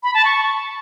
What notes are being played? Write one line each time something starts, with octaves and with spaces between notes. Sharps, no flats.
B5
A5
C#6